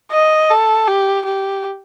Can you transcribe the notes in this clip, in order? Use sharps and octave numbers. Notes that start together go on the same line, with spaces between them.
D#5
A4
G4
G4